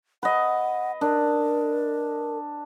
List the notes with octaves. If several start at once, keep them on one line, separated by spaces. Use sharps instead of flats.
B4 D#5 F#5
D4 A#4